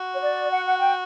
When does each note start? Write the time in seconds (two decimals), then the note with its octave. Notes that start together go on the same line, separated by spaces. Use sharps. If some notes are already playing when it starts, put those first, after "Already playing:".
Already playing: F#4
0.14 C#5
0.21 D5
0.50 F#5
0.65 F#5
0.79 G5